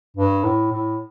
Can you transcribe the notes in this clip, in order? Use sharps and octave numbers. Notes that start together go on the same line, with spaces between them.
G2
A2
A2